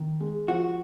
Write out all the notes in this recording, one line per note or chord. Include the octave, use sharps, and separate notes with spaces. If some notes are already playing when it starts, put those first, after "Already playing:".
Already playing: D#3
G#3
F3 F#4